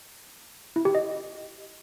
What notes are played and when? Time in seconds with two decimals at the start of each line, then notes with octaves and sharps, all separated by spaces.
0.76 E4
0.85 G4
0.95 D#5